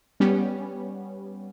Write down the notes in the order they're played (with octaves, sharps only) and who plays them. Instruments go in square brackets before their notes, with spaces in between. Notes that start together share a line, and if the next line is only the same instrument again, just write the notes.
[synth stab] G3 B3 C#4